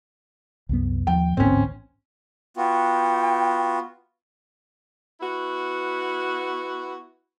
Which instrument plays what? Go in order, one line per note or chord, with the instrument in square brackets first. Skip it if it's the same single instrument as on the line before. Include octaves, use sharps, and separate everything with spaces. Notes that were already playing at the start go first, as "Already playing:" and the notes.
[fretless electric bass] C2 F#2 B3
[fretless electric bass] D#2 F3 [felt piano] G5
[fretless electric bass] A1 D2 G#2 [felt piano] C4 C#4
[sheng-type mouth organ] B3 F4 F#4 [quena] G5
[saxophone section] B3 E4 F#4